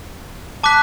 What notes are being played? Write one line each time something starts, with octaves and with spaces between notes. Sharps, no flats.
A5 D6 F#6 B6